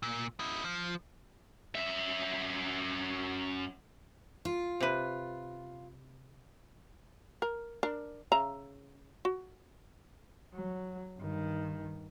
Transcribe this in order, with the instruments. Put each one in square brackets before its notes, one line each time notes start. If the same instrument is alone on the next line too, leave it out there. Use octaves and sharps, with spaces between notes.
[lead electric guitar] A#2
D#4 E4
F3
[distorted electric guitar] F#2 E5
[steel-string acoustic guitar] F4
[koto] C3 B4
[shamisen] A#4
D4 A#4
C#3 E5 A#5
F#4
[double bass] F#3
G2 D#3